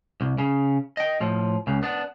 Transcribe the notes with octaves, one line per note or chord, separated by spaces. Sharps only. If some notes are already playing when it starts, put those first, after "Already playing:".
C2
C#3
D#5 G5
A2 F3
C#2 C#3
B3 D4